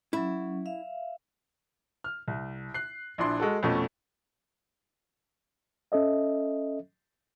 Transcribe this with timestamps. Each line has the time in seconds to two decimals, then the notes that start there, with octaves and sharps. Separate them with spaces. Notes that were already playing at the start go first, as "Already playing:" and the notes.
0.13 F#3 C#4 E4
0.66 E5 F5
2.04 F6
2.28 C2
2.74 F#6 C7
3.18 A#1 D4 E4 C6
3.40 G#3 F#4 A4
3.63 F2 B2 A3 C#4
5.92 C#4 A4 D#5 E5